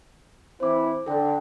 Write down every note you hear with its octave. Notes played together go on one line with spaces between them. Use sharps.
E3 C4 E4 C5 D6
D3 A4 G5